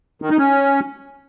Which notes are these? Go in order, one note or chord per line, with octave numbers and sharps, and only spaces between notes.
D#3
D#4
C#4